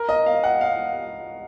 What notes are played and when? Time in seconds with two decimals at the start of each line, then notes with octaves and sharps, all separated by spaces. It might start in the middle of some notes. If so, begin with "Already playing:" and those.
Already playing: A#4
0.09 D#5
0.26 F5
0.43 F#5
0.61 F5